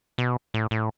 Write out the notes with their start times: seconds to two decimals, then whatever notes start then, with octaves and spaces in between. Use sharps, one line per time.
0.18 B2
0.54 A2
0.71 A2